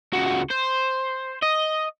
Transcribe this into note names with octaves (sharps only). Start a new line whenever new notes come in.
C#2 F#4
C5
D#5